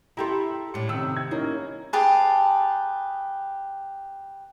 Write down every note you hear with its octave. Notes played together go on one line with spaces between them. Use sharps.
E4 G4 A4 A#5 C6
A2 D4 C#7
C3 D#3 E6
G#6
A#3 C#4 D#4 E4
G4 G#4 B4 A5